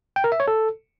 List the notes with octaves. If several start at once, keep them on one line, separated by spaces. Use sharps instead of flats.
G5
A#4
E5
C#5
A4